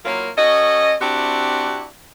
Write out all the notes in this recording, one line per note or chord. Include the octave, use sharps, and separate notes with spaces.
F#3 A#3 E4 F4 A#4 C#5
C#4 F#4 A4 D#5
C4 D4 E4 F#4 G4